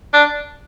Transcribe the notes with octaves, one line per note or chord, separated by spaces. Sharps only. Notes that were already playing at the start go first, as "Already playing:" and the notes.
D4